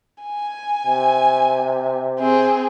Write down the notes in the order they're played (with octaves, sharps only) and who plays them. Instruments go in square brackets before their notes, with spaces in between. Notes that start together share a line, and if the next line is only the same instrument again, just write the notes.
[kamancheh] G#5
[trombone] C3
[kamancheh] C4 G#4